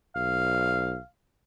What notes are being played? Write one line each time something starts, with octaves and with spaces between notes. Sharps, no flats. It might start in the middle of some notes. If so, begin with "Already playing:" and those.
B1 F5